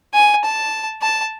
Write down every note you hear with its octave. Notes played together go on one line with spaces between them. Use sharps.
G#5
A5
A5